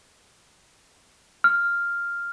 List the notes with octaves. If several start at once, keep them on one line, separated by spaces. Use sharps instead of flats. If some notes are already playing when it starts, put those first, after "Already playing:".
F6